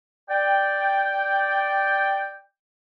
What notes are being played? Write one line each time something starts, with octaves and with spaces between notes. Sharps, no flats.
D5 G5